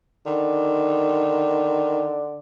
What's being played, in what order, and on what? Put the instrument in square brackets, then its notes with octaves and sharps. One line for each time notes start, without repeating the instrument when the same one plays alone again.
[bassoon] D3 [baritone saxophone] D#3